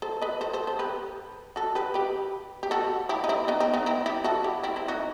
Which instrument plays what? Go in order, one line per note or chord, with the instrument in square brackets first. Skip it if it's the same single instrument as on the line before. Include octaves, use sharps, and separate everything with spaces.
[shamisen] A4 C5
B4 D#5
A4 C5
A4 C5
A4 C5
G4 B4
F#4 A4
G4 B4
G4 B4
G4
F#4 A4
E4 G4
D#4
C4 E4
B3 D#4
C4
B3 D#4
C4 E4
E4 G4
F#4 A4
E4 G4
C4 E4
C4 E4
D#4 F#4